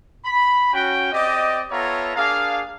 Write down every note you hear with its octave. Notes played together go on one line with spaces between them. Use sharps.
B5
C#4 F#4 G5
C4 G4 D5 D#5
B3 F4 A4 C#5 E5 A#5
A#3 D4 G#4 F5